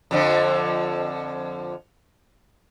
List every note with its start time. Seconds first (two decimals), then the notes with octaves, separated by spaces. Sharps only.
0.11 F2 D3 F3